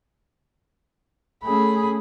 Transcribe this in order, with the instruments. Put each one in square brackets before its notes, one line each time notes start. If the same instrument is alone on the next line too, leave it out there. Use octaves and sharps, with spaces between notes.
[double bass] A3 C#4 [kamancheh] G#4 B5